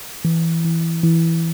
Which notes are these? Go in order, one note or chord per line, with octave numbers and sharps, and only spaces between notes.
E3
E3
E3